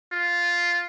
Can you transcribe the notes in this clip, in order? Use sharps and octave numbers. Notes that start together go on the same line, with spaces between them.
F4